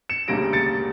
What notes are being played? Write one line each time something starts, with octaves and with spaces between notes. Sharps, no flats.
C#7 E7
E1 D2 C#3 G3 A#3 A#6 D7
A6 C#7